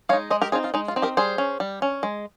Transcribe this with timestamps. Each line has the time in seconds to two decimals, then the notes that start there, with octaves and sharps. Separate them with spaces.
0.09 G#3 C#5 F5
0.13 D#4
0.31 G#3 C5 D#5
0.42 G4 A#4
0.52 C4 D#4 F4 G#4
0.64 F4
0.74 G#3 D#4
0.88 F4
0.96 C4 D#4
1.02 G4 A#4
1.17 G3 G#4 C5
1.38 C#4
1.60 G3
1.82 C#4
2.03 G#3